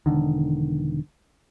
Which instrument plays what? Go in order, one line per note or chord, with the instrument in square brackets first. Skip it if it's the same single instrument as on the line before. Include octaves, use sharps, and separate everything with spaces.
[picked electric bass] E1 B2 D3 D#3